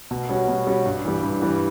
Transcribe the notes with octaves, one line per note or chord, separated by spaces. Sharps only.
B2
G3 C#4 F#4
B2
G3 C#4 F#4
G2
E3 G3
G2
E3 G3